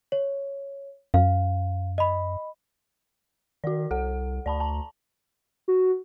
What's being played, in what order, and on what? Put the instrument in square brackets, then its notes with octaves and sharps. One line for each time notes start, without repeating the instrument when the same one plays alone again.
[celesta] C#5
[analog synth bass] F#2 [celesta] F5
[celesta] D#5 B5
[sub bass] D#3 [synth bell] F#4 D5
[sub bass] C2 [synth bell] A4 F#5
[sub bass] D2 [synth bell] D5 A5 B5
[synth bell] A5 A#5
[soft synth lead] F#4